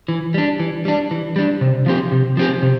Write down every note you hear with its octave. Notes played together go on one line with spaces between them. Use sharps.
E3
G3 D4
E3
G3 D4
E3
G3 D4
C3
F3 C4 G4
C3
F3 C4 G4
C3